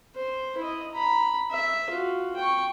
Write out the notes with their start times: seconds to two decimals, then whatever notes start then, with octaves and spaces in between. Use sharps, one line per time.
0.15 C5
0.57 E4 D#5
0.92 A#5 B5
1.51 E5
1.91 F4 F#4
2.36 G5 C#6